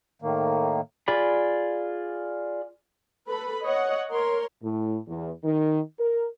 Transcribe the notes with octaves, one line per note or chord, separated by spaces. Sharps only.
A2 D#3 A#3
F4 G#4 D5 B5
A4 B4 B5
C#5 D#5 F#5
A#4 C#5 C6
A2
E2
D#3
A#4